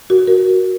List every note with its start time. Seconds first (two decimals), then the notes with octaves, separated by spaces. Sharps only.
0.10 F#4 A#4
0.27 F#4 A#4